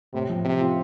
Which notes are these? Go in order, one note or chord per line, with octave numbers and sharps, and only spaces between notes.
A2 C3
F3
C3 C4
F4